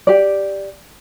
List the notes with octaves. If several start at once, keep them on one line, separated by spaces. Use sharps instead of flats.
G4 D5